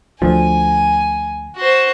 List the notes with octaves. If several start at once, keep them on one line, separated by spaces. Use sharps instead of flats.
D2 F3 G#5
F#4 C5